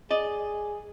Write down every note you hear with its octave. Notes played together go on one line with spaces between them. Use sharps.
G#4 D5 D#5